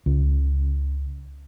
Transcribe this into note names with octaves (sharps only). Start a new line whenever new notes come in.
C#2